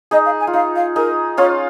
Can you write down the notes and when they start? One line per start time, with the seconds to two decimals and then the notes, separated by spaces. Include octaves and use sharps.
0.11 D#4 G#4 D#5
0.25 F5
0.40 G#5
0.47 F4
0.53 D#4 F5
0.75 F5
0.96 D#4 G#4 A#4
1.37 C#4 F4 C#5